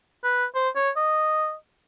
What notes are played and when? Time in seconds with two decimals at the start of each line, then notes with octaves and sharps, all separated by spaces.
0.24 B4
0.55 C5
0.76 C#5
0.96 D#5